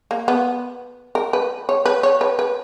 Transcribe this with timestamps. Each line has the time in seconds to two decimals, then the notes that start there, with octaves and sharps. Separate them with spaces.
0.11 A#3
0.28 B3
1.15 A#4
1.33 B4
1.69 C#5
1.85 B4
2.03 C#5
2.21 B4
2.39 B4